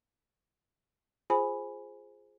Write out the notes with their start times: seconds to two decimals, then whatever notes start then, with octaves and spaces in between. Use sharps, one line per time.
1.30 F4 G#4 C5 G#5 B5